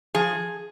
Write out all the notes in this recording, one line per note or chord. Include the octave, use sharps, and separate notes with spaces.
F3 G#4